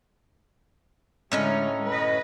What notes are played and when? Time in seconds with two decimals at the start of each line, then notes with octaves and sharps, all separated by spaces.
1.32 A2 D3 G#3 C#4 D#4
1.88 B4 D#5